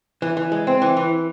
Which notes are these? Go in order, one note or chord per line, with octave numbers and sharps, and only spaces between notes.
E3
E3
G#3
C4
E3
E3